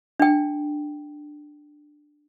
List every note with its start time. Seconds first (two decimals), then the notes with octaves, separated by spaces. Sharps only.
0.20 D4 G5